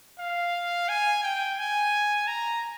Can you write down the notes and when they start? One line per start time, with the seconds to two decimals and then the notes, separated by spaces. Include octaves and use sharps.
0.19 F5
0.89 G#5
1.24 G5
1.58 G#5
2.28 A#5